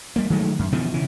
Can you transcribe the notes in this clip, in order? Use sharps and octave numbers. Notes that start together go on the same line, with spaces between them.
G3 A#3
D#3 F#3 G#3 A3
F#2
B2 D3 E3 F3
C#3 E3